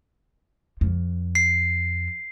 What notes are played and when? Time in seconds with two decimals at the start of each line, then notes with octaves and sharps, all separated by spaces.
0.81 F2
1.35 C7